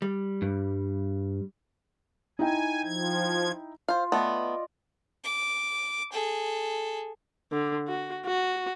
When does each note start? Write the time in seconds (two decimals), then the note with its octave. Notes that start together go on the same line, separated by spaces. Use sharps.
0.02 G3
0.42 G2
2.39 D#4 E4 G5 G#5
2.84 F3 G#6
3.88 F4 C5 F5
4.12 A3 B3 D5 D#5
5.24 D6
6.12 G#4 A4
7.52 D3
7.88 F#4
8.26 F#4